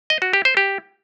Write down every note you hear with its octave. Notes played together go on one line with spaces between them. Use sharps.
D#5
F#4
G4
C5
G4